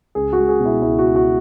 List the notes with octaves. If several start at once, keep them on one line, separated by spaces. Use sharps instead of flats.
C#2 G#4
F#4
G#3
G#4
B2
E4
C#2 E4
F#4
C#2
F#4